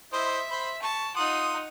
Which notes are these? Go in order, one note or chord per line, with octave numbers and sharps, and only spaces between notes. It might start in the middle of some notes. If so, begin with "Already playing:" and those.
E4 C5 D#5 E5
C5 B5 C6
A5 C#6
D#4 F4 F#5 C6 D#6